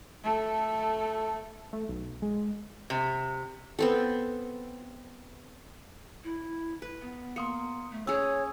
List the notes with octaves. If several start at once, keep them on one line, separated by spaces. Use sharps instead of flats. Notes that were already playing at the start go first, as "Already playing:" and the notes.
A3 A4
A3
B1
G#3
C3
B3 C4 A4
E4
B4
B3
A#3 C6 D#6 C#7
A3
C#4 G#4 C#5 E6